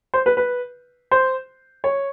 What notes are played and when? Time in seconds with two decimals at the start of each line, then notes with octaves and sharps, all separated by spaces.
0.14 C5
0.26 B4
0.37 B4
1.11 C5
1.84 C#5